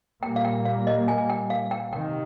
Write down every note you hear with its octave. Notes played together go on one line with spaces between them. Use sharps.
A#2 G3 A#3 G5
F5
G5
F5
D#5
G#5
G5
F5
G5
C3 D#3 G5